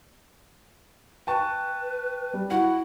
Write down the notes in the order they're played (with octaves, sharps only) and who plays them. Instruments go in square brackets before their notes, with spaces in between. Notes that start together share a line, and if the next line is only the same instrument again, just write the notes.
[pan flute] B4 [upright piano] G5 A5 C#6
[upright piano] G3
[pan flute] E4 [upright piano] F#4 F#5